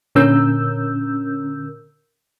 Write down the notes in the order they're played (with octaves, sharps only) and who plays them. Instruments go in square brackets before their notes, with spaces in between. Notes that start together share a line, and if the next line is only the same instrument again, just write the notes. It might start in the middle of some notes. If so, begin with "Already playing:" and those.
[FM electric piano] A#2 D3 C#4 A#4 E6 G6